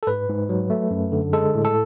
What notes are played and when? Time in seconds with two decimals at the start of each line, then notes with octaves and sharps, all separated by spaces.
0.03 A4
0.07 G#2 B4
0.29 G#2
0.49 F#3
0.70 A3
0.91 F#2
1.12 D3
1.33 G#3 A4
1.55 A2
1.65 A4